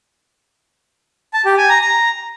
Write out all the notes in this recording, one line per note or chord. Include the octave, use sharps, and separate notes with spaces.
A5
G4
G#5
A#5
A#5